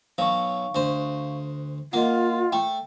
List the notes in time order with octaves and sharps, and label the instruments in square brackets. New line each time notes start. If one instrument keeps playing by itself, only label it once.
[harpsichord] B1 F#3 [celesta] F5 C#6
[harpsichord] D2 C5
[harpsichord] A#3 [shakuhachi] F4 [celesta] D#5 F#5
[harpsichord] A3 [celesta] G5